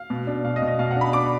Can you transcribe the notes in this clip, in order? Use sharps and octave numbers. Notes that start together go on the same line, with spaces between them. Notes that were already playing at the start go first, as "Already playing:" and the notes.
Already playing: F5
B2
D4
B2 F5
D#5
B2
D#5
B2 F5
F#5
D4
B5
D4 D6